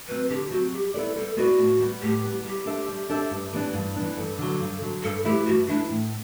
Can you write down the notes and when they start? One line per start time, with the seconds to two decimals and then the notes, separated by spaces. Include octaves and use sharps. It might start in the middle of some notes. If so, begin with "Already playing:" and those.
0.08 F#3 C4 B4
0.30 D3 G4
0.50 F#3 C4 F#4
0.72 G3 G4
0.94 B3 E4 A4 B4 D5
1.16 G3 A4
1.37 B3 E4 F#4 B4 D5
1.58 A2
1.80 G3 B3
2.02 A2 G4
2.24 G3 B3
2.45 G3 G4
2.66 D4 A4 C5 E5
2.88 G3
3.09 D4 A4 C5 E5
3.30 G2
3.53 E3 B3 D4
3.73 G2
3.96 E3 B3 D4
4.17 G2 A4
4.38 D3 F#3
4.59 G2
4.81 D3 F#3
5.03 G2 A4
5.24 E3 A3 E4 G4
5.46 G2 F#4
5.67 E3 A3 D4 E4
5.89 A2